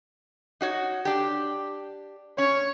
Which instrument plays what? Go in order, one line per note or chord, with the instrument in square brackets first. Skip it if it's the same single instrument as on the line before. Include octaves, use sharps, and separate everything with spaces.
[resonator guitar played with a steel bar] D#4 F#4 C#5
D4 G4
[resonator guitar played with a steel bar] C#4 [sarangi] C#5